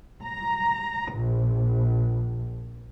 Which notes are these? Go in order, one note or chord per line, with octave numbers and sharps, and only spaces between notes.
A#5
A#1